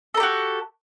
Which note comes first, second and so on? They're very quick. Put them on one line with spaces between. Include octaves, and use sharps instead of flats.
A4 A#4 G4 F#4